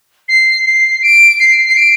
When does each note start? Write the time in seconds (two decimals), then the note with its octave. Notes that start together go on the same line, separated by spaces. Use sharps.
0.29 C7
0.66 C7
1.03 D7
1.40 C7
1.65 C7
1.77 D7